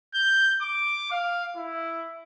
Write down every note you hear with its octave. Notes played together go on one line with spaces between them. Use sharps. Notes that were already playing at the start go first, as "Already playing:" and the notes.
G6
D6
F5
E4